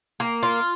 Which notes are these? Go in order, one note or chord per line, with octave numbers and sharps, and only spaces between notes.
A#3
F4